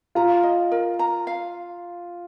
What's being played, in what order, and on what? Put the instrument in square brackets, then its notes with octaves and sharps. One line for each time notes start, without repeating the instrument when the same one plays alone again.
[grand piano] F4 [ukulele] A#5
[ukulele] D#5
A#4
A#5
F5